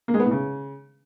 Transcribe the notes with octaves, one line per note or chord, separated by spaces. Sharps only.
A#3
G#3
B3
A2
C#3